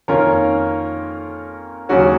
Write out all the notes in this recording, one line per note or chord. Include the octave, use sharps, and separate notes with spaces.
F2 D#3 A#3 C#4 F4 A#4
D#2 C#3 F#3 C#4 F#4